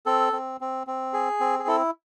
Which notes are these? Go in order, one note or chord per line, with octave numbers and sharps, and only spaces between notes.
C4 A4
C4
C4
C4
G#4
C4
G#4
E4 A4